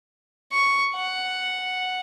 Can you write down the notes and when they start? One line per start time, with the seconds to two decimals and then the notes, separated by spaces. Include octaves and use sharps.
0.53 C#6
0.95 F#5